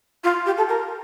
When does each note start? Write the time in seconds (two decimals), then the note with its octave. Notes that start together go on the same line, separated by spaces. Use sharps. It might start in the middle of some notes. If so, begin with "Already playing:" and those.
0.24 F4
0.46 G4
0.57 A4
0.69 A#4